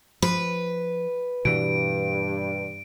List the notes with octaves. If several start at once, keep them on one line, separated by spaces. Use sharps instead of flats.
F3 B4
G2 B2 E3 D7